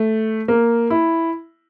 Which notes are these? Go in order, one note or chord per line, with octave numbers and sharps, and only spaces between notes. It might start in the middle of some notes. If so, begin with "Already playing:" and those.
Already playing: A3
A#3
E4